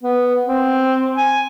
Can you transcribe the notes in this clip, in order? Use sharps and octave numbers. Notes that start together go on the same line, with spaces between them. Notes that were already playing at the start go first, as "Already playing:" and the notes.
B3
C4
G#5